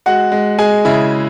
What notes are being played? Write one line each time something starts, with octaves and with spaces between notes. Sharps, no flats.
G#3 F#4 F#5
G#3
G#3 G#4 G#5
C#3 E4 E5